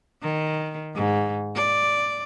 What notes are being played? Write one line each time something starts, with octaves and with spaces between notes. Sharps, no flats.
D#3
G#2
D5